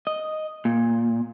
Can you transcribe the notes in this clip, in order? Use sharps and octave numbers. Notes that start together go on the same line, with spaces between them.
D#5
A#2